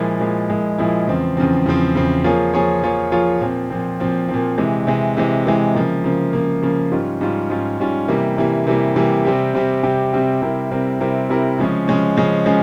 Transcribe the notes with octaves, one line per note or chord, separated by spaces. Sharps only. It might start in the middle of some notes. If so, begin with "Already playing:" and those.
Already playing: A#2 F3 G#3 E4
A#2 F3 G#3 E4
A#2 F3 G#3 E4
A#2 F3 G#3 E4
E2 C#3 F3 C4
E2 C#3 F3 C4
E2 C#3 F3 C4
E2 C#3 F3 C4
F3 A#3 F4 G#4 C#5
F3 A#3 F4 G#4 C#5
F3 A#3 F4 G#4 C#5
F3 A#3 F4 G#4 C#5
A#2 F3 C4
A#2 F3 C4
A#2 F3 C4
A#2 F3 C4
C3 E3 G#3
C3 E3 G#3
C3 E3 G#3
C3 E3 G#3
C#3 F3 A#3
C#3 F3 A#3
C#3 F3 A#3
C#3 F3 A#3
G#2 G3 C#4 F4
G#2 G3 C#4 F4
G#2 G3 C#4 F4
G#2 G3 C#4 F4
C3 E3 G3 A#3
C3 E3 G3 A#3
C3 E3 G3 A#3
C3 E3 G3 A#3
C3 G3 C4 G4
C3 G3 C4 G4
C3 G3 C4 G4
C3 G3 C4 G4
C3 G3 C4 E4 A#4
C3 G3 C4 E4 A#4
C3 G3 C4 E4 A#4
C3 G3 C4 E4 A#4
C#3 F3 G#3 C#4
C#3 F3 G#3 C#4
C#3 F3 G#3 C#4
C#3 F3 G#3 C#4